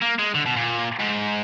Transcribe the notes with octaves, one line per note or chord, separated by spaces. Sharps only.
A#3
G#3
D3
B2
A#2
G#2